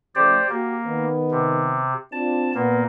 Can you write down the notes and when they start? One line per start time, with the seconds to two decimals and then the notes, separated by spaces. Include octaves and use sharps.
0.15 C#3 F3 A3 G4 C5 D5
0.50 A#3 F#4 G4
0.86 D#3 B3
1.31 C3
2.12 C4 D4 F4 A5
2.55 A#2 A#3 B3